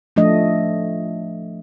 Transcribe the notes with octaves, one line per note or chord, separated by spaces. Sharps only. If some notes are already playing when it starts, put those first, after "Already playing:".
F3 A3 D4 D#5